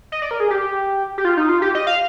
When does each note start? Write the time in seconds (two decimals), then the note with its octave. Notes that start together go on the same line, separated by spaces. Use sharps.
0.12 D#5
0.22 D5
0.31 A#4
0.40 G#4
0.50 G4
1.18 G4
1.25 F4
1.37 D#4
1.49 F4
1.62 G4
1.75 D#5
1.87 F5